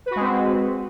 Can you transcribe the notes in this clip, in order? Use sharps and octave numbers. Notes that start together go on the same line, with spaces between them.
G#3 C4 F#4 B4